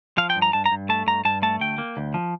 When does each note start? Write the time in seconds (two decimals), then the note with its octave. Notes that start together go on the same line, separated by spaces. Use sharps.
0.18 F3 F5
0.30 G5
0.36 G2
0.42 A#5
0.53 G2 A5
0.66 A#5
0.72 G2
0.89 A3 A5
1.07 G2 A#5
1.25 G2 A5
1.42 A3 A5
1.60 D2 G5
1.78 A#3
1.97 D2
2.14 F3